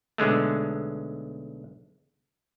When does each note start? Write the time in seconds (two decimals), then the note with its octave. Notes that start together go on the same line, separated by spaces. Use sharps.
0.18 B1 D3 G#3 A3